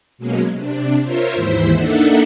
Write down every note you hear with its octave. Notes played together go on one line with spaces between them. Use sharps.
B2 F#3 G#3 A#3 C#4
C3 D4
F4 A#4 C5 C#5 E5
D#2 G#2 E3 E4 C5 B6
A#3 D4 D#4 A4 E5 F#5